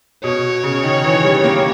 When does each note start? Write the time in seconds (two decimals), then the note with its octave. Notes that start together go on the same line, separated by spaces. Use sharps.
0.24 B2 C#5
0.64 C#3
0.84 D#3
1.04 E3
1.25 G3
1.44 A#3